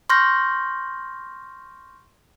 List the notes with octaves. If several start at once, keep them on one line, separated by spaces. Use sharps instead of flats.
C6 C#6 F6 G6 A#6